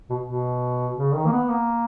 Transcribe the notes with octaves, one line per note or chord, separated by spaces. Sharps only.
B2
B2
C#3
D#3
A#3
B3
A#3